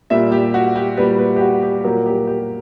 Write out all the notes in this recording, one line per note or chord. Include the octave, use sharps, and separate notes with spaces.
A#2 G3 E5
G4
F#4
G4
A#2 G3 B4
B4
G4
F#4
G4
A#2 F#3 A#4
G4
G4